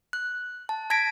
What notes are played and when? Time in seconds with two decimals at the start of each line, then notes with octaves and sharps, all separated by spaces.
0.13 F#6
0.69 A5
0.90 A5 G#6 A#6 B6 D7